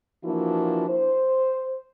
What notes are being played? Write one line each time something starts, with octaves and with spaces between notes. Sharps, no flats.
E3 F3 A#3 D4 E4 F#4
C5